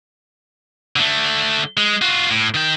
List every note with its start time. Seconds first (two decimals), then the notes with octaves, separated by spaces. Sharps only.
0.96 D3 A3
1.77 G#3
2.02 F4 F#4
2.31 A2
2.55 D#3 G5